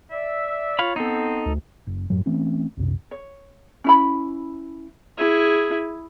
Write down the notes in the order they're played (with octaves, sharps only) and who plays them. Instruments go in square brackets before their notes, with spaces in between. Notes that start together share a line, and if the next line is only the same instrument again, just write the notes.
[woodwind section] D5 E5
[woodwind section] F4 C#5 [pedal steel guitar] F5 B5
[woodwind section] B3 C4 [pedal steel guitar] D#4 A4
[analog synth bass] D2
[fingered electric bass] F#1
F#2 A2 F#3
E3 A3 C4 C#4
C2 F#2 C3
[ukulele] C#5
C#4 E4 B5
[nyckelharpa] E4 G#4